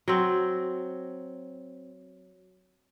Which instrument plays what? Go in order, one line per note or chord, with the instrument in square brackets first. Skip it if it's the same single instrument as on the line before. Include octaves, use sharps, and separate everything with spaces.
[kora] F#3 C4